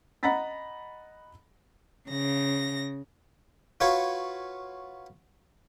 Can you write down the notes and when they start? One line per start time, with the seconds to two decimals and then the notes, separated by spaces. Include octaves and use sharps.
0.23 D#5 F#5 A#5 B5 A6 B6
2.09 C#3 A#6
3.80 F4 F#4 B4 C#5 F5